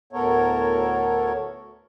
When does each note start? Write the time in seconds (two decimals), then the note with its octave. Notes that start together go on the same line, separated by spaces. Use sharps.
0.13 D2 A2 B3 A4 A#4 C#5